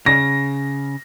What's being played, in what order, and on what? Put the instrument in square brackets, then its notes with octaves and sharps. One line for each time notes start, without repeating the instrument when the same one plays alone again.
[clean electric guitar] C#3 [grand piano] A#6